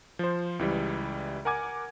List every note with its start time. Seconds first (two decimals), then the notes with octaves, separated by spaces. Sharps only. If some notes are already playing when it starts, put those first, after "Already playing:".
0.19 F3 C5
0.59 C#2 E3 G3
1.45 A#4 F#5 G#5 D6 G#6